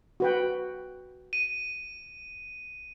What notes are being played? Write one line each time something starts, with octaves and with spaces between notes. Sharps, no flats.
F#4 B4 G5
D#7